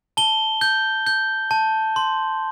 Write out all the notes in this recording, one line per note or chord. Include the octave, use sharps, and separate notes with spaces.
A5 G7
G6
G6
A5
C6